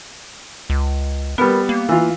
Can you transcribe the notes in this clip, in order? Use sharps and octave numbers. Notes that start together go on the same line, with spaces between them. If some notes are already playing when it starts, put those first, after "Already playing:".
C#2
G3 B3 A#4
A#3
E3 F4